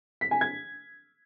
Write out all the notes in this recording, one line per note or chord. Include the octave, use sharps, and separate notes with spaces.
B6
G#5
G#6